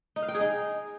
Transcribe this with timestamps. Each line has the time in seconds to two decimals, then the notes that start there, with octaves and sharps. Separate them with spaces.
0.16 D#4
0.22 F5
0.28 G5
0.35 G#4
0.41 D#4